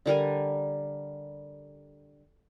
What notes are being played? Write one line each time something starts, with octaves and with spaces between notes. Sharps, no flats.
D3 G3 A#4 G#5